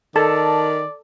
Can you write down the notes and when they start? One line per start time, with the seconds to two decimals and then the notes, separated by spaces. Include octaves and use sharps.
0.16 D#3 A4 D5 A5